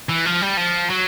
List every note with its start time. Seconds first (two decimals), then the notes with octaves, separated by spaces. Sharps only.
0.09 E3
0.26 F3
0.42 G3
0.57 F3
0.90 F#3